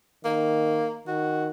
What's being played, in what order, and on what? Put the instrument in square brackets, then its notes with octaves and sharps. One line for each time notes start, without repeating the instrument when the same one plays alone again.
[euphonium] D#3 [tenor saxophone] A#3
[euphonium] D#3 [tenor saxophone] F#4